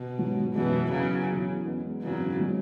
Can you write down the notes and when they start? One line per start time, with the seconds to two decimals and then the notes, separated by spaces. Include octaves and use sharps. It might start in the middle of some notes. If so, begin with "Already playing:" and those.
Already playing: B2
0.17 G#2 F#3 B3
0.53 F#1 F#2 B2 E3 F#3 B3 G#4
0.91 E2 C#3 E3 F#3 C#4
1.28 E1 E2 E3 C#4
1.64 E2 C#3 G#3 B3
2.02 G#1 F#2 C#3 E3 F#3 B3
2.39 B2 F#3